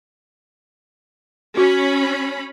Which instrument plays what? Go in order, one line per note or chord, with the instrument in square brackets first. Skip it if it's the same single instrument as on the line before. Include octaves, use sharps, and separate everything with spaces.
[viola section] C#4 B5 [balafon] F#4